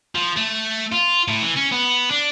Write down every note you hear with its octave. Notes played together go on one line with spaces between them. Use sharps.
F3
A3
F4
A2
E3
C#4
B3
D4